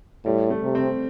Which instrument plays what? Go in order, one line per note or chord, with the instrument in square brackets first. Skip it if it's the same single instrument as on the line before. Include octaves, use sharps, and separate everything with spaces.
[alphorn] A2 [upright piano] G3
[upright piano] A3
[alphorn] C3
[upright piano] C4